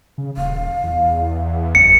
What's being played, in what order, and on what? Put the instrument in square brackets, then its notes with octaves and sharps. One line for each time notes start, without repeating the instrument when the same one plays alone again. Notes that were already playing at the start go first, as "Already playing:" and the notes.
[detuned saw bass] C#3
[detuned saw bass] D#1 [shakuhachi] F5
[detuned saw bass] E2
[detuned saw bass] F#1 [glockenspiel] C#7